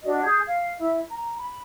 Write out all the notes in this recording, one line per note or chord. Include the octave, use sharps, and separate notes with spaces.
D4 F#4 D5 D#5
G#4 D#6 G6 G#6
F5
E4 E5
A#5
B5